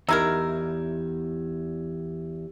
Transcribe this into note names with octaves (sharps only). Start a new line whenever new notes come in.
E2 D#4 E4 G4 A#4 E6 G#6